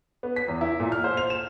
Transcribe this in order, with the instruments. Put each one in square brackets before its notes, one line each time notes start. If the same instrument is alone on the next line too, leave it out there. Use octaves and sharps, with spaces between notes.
[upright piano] B3
B6
E2
E4
A#2
F6
C5
F7
E7